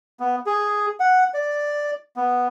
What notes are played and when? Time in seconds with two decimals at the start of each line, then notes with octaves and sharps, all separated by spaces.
0.20 B3
0.46 G#4
1.00 F#5
1.34 D5
2.16 B3